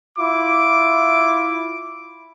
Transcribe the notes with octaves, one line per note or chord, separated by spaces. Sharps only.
E4 F4 D6